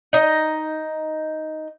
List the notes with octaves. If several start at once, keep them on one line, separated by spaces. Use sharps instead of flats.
D#4 D#5